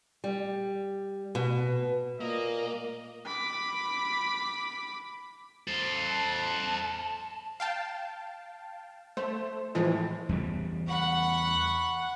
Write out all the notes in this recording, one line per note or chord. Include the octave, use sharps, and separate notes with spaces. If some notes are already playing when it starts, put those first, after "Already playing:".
G3
B2
A#2 A#3 D#5
B5 D6
A4 C5
A5
F5 G5 A5
A3 C5
A2 E3 F3 G#3
E2 C#3 G3
F#5 B5 C#6